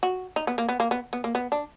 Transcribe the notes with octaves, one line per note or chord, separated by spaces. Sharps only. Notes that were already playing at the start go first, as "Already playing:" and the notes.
F#4
D#4
B3
A#3
B3
A#3
B3
B3
A#3
B3
D4